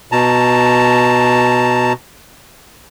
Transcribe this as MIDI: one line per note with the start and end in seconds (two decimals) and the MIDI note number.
0.12 1.93 47
0.12 1.93 81
0.12 1.93 82